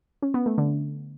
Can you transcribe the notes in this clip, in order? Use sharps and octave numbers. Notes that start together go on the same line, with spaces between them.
C#4
B3
A3
D3